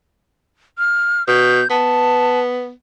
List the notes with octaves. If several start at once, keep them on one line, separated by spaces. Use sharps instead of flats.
F6
B2 G6
B3 A5